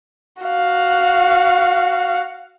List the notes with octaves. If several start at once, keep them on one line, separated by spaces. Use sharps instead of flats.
F#4 F5